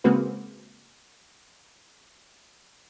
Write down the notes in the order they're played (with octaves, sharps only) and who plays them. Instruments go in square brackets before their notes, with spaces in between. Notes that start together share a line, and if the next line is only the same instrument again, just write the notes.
[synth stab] C#3 G#3 A#3 C4 F#4 B4